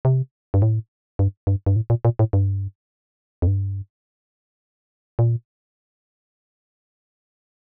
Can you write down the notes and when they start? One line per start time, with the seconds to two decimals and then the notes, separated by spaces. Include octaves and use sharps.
0.05 C3
0.54 G2
0.62 A2
1.19 G2
1.47 G2
1.66 G2
1.76 A2
1.90 A#2
2.05 A#2
2.19 A2
2.33 G2
3.42 F2
3.47 G2
5.19 A#2